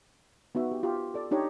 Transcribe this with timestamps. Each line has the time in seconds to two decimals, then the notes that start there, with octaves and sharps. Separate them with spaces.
0.55 B3 D#4 F#4 E5
0.71 G4
0.83 F4 G4
1.14 A4 D5
1.31 D4 D#4 G4 C#5 D#5